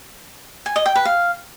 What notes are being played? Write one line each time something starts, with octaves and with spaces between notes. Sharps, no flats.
G#5
D#5
G5
B4
F5